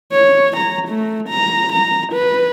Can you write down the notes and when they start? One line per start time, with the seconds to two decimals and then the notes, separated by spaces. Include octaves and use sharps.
0.12 C#5
0.57 A#5
0.88 A3
1.29 A#5
1.73 A#5
2.13 B4